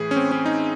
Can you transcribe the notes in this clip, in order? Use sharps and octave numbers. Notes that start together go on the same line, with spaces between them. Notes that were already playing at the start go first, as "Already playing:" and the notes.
Already playing: A2 E3 G#4
C#4
C4
C#4
D#4